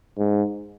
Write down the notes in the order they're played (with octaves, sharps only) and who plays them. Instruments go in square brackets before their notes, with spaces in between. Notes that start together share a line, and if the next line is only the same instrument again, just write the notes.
[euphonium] G#2